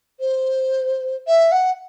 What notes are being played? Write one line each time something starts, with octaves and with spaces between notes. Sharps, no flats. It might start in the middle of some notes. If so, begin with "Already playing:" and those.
C5
E5
F#5